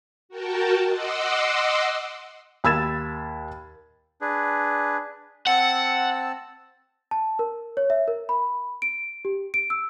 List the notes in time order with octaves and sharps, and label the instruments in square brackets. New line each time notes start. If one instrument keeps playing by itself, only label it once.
[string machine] F#4 A#4 G5 A5
D#5 F#5 C6 D6 E6
[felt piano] D#2 B5 E6 G#6 A6 E7
[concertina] D4 G#4 B4
[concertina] C4 A5 E6 [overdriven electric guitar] F#5
[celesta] A5
A#4
C#5
E5
A#4
B5
D7
G4
D7
E6